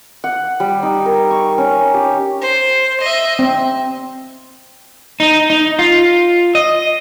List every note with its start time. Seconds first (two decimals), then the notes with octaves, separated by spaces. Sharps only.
0.24 F#5
0.60 G3
0.83 D#4
1.06 A#4
1.31 C#6
1.58 C#4
1.94 G4
2.41 C5
3.01 D#5 E5
3.39 C4
5.20 D#4
5.50 D#4
5.79 F4
6.55 D#5